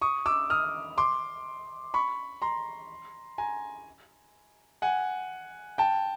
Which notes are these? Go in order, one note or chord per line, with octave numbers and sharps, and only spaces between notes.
C#6 D#6
D6 E6
D#6 F6
C6 D6
B5 C#6
A#5 C6
G#5 A#5
F#5 G#5
G5 A5